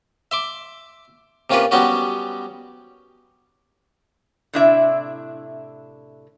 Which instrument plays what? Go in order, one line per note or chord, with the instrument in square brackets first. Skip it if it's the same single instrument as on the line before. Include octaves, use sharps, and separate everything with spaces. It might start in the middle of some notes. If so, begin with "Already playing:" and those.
[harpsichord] E5 C6 D6
C3 A#3 C#4 F4 A#4 B4
F#3 G3 B3 C#4 F#4
[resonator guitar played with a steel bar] A2 C3 D4 E4 E5